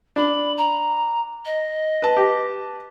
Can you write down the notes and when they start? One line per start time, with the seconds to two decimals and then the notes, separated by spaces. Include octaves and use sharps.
0.16 D4 B5
0.57 A#5
1.45 D#5
2.02 B4 A5
2.17 G4